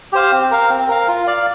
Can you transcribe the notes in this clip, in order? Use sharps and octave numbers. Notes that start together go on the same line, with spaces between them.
G4 C5 F5
C4
A#4 F5
C4
A#4 F5
F4
D5 F5